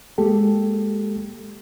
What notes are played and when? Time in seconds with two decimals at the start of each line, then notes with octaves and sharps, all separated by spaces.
0.18 G#3 A#3 G4 A4